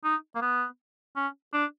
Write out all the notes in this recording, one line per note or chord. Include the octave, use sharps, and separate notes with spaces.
D#4
A#3
B3
C#4
D4